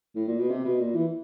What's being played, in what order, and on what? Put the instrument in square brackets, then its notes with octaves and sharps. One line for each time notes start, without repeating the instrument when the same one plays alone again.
[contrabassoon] A2
A#2
B2
C3
B2
A#2
E3